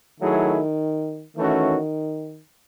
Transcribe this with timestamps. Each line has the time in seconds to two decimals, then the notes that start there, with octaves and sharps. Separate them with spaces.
0.20 D#3 F#3 A3 E4 G#4
1.37 D#3 E3 A3 C#4 F#4